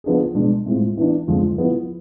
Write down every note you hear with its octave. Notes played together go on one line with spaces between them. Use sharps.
F3 B3 D4 G#4
B2 G#3 D4
A2 G#3 C4 F4
E3 B3 D4
F2 D3 F3 G#3
F3 B3 E4